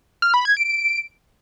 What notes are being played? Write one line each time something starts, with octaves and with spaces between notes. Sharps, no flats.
F6
B5
G#6
D7